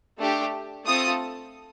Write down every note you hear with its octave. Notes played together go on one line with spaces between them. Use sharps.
A3 D4 G4
A3 C4 F4 A4 D#6